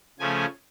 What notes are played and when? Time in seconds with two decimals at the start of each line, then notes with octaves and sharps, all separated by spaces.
0.19 C#3 F3 A3 C#4 G#5